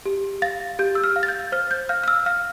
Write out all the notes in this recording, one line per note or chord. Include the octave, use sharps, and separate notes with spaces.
G4
F5 A6
G4 G6
E6
F6
F5
A6
G6
C5 F6
G6
F5 F6
F6
E6
F5 F6